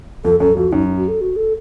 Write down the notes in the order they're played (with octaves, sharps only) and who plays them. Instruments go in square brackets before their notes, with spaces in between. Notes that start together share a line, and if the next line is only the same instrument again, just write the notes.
[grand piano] F2 [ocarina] A4
[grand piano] F#2 [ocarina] A4
[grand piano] F2 [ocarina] F#4
[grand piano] F#2 [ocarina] D#4
[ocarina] F#4
A4
F#4
A4